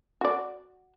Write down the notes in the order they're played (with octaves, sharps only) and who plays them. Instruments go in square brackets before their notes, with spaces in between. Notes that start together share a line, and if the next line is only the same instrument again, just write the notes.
[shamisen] F#4 D5